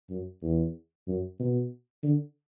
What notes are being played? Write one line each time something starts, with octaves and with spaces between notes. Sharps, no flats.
F#2
E2
F#2
B2
D3